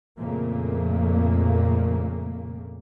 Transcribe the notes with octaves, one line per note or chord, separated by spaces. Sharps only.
F2 A#2 C#3 A3 A#3